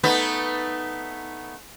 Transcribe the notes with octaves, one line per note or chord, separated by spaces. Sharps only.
A3 B3 D#4